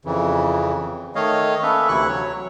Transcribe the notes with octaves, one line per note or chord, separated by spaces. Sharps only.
F2 C#3 E3
D#3 A3 C#5 D#5 F5
A#3 C#4 A4 B4 E5
D2 C3 E3 E4 C#6 F#6
F#3 C#5